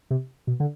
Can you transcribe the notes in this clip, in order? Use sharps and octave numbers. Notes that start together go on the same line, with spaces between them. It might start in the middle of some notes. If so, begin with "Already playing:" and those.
C3
B2
D3